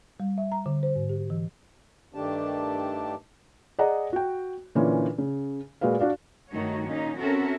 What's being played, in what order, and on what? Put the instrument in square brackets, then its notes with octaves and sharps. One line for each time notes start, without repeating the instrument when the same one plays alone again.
[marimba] G3
E5
A#5
D3
C5
G#2
G4
E3
[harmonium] G2 D#3 A3 D4 G4 A5
[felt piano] G#4 D5 D#5 F#5 A#5
F#4 G5
A#2 D3 E3 C#4 F4
C#3
A#2 G#3 F#4 B4 F5
D4 F#4 D5 F5
[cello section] G2 D#3 A3 D#4 F#4 C#5
A#2 C#4 D#4
C4 C#4 F#4 A4 A#4 E5